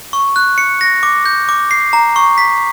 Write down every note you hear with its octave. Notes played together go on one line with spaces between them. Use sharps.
C#6
F#6
C#7
A#6
D6
G6
D6
C7
A#5
C#6
B6